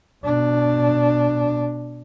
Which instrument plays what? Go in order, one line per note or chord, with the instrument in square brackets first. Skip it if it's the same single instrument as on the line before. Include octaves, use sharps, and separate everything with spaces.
[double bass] B2 D4